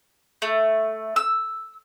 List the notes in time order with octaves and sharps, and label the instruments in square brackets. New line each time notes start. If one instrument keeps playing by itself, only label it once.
[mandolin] A3
E6